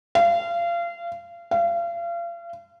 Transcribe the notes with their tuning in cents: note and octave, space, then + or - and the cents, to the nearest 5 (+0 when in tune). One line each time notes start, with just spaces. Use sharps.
F5 -30
F5 -35